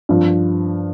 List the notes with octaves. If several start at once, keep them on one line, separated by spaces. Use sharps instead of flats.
G2 F3